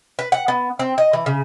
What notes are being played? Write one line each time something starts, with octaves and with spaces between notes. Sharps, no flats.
B4
F#5
B3
C4
D#5
E3
C#3